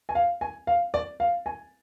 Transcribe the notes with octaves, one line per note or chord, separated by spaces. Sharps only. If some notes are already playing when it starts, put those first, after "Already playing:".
G#5
F5
G#5
F5
D5
F5
G#5